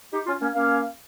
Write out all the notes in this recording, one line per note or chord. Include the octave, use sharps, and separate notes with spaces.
D#4 G4
C#4 F4
A#3 C#4
A#3 C#4 F5